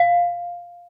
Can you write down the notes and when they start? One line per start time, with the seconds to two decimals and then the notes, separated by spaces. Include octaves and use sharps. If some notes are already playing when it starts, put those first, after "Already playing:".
Already playing: F5